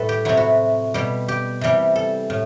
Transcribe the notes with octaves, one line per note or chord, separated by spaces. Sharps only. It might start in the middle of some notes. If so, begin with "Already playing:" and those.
Already playing: A2 G3 A4 B4
G4
C3 F#3 E4
F#4
B2 G3
G4
C3 E3 G3
A4
A2